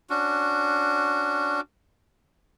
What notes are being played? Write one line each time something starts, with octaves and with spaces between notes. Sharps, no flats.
C#4 D4 F#4